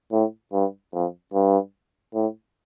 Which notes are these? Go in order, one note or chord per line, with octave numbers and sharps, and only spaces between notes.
A2
G2
F2
G2
A2